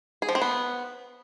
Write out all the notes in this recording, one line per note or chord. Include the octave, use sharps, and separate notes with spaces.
G#4
F3
C4
B3